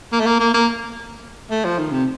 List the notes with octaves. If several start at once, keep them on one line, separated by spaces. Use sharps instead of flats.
A#3
A3
A#3
A#3
A#3
A3
F3
D#3
C3